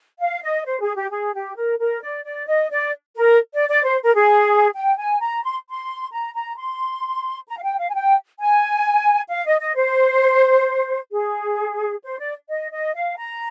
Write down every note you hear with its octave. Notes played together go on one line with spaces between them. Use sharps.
F5
D#5
C5
G#4
G4
G#4
G4
A#4
A#4
D5
D5
D#5
D5
A#4
D5
D5
C5
A#4
G#4
G5
G#5
A#5
C6
C6
A#5
A#5
C6
A#5
F5
G5
F5
G#5
G5
G#5
F5
D#5
D#5
C5
G#4
C5
D5
D#5
D#5
F5
A#5